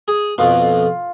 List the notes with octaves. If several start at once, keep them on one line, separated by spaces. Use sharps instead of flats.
G#4
F2 B2 F4